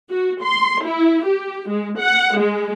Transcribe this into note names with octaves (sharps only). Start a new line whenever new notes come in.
F#4
C6
E4
G4
G#3
F#5
G#3